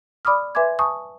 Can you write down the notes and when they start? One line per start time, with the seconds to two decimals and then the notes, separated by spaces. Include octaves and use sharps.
0.25 D5 B5 D6 D#6 F6
0.55 B4 E5 G#5 C6 D6 G#6
0.79 G#5 A5 C#6 D#6